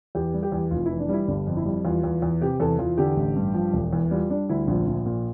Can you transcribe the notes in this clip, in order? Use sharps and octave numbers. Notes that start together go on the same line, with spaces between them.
E2 G4
G3
G4
E2
F1 F4
E3 E4
D4
G3 E4
G1 D4
F2
E4
G3
E2 F4
E2
E2
C3 G4
E2 A4
E2 F4
D3 G4
A1
G2
F3
E1
E2
G3 F4
G3 D4
D2 E4
A#1 F4
A#1
A#2